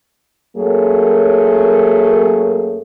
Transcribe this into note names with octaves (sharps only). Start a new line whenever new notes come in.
F#2 F#3 A3 A#3 G#4